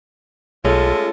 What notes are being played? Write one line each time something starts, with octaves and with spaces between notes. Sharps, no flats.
B1 G#3 A3 C#4 F4 A4